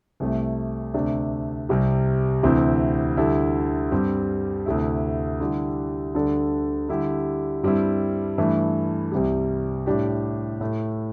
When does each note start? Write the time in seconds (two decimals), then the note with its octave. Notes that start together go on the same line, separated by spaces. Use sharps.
0.20 C2 C3 A3
0.94 D2 C3 A3 D4
1.69 C2 C3 G3
2.43 D2 C3 E3 C4 E4
3.17 D2 D3 G3 E4 A4
3.92 G2 G3 C4 G4
4.66 D2 C3 A3 E4
5.40 D3 G3 E4 G4
6.14 D2 D3 G3 D4 A4
6.89 D3 G3 E4 G4
7.63 G2 G3 C4 E4
8.38 G2 E3 A3
9.12 C2 C3 G3
9.86 A2 G3 D4 G4
10.61 A2 A3 E4